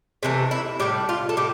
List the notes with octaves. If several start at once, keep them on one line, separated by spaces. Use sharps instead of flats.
C3 E3 A3
E4
A2 G3 G4
F4
A4
A2 G4